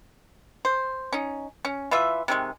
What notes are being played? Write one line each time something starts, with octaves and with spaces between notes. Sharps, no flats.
C5
C#4 D#4
C#4
E3 F4 E5
C3 D#3 G#3